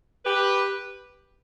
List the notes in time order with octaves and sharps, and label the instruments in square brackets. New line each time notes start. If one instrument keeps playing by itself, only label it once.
[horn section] G4 B4